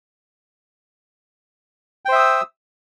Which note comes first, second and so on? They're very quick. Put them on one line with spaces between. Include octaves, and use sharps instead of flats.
G5 C5 E5 D#6 E6